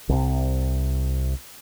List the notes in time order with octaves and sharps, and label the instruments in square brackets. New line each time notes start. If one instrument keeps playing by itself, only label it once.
[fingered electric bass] C2 C3